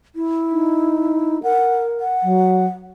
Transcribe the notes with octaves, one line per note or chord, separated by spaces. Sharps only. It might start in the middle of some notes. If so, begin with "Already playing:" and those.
E4
D#4
A#4 F#5
F#5
F#3